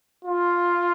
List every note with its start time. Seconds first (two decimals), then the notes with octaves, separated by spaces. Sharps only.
0.25 F4